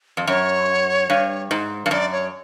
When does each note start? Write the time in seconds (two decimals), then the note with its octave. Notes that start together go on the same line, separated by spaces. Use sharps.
0.17 F2
0.27 F#2 C#5
1.10 G2
1.51 G#2
1.86 G2
1.91 F#2 D5
2.12 C#5